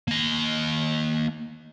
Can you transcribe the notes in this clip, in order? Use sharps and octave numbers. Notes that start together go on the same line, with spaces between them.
A#3 D#5